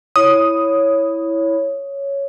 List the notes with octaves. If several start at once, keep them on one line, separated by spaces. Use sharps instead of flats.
E4 C#5 D#6